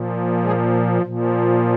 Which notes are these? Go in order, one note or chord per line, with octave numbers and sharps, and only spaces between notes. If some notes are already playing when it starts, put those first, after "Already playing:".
Already playing: A#2 F3
G#3 G#4
A#2 F3